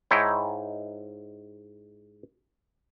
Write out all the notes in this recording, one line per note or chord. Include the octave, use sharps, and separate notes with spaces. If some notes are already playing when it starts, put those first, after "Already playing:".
G#2 D#4 E4 C#5 G5